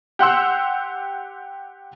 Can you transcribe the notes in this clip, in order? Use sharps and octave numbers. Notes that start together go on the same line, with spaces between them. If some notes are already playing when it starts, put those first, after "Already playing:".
G4 F#5 C6 E6